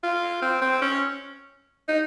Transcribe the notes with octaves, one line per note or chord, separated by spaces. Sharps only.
F4
C4
C4
C#4
D#4